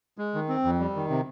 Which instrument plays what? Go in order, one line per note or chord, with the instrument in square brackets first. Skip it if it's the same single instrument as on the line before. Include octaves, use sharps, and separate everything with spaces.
[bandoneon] G#3
D#3
C4
F2
G3
D#3
C3